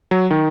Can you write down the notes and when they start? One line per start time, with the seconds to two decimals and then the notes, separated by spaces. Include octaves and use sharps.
0.11 F#3
0.31 D#3